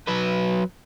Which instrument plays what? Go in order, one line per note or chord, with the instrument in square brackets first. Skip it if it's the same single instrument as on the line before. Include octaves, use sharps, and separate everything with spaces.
[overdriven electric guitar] F#3 B4